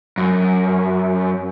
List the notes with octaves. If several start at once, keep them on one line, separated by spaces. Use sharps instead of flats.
F#2